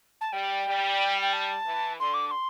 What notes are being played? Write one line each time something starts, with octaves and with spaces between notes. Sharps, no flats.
A5
G3 G5
G3
G5
A5
E3
D3 C6
D6
D6
C6